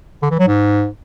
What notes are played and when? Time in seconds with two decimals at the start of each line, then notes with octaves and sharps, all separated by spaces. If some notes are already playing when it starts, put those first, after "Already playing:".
0.22 D3
0.30 E3
0.39 F#3
0.47 G#2